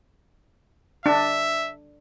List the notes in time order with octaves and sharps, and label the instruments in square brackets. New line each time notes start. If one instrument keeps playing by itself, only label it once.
[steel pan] D4 [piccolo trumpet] E5